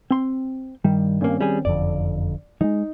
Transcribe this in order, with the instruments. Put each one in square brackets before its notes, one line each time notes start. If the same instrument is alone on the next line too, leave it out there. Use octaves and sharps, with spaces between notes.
[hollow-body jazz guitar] C4 C6
[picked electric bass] G2 D#3 [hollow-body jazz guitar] G3
[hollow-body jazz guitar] G2 A#3 [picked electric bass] D#3 C4 C#4
[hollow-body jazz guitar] G3 G#4
[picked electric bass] F#1 F2 D3 [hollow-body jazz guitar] D5
[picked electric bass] F3 G#3 [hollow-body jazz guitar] D#4